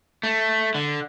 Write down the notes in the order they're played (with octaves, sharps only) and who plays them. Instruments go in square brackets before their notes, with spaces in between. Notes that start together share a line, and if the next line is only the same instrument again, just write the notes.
[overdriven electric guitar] A3
D3